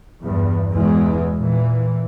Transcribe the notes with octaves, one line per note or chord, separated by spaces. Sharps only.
E2 G2
E2 B2 E3 G#3
A#2 E3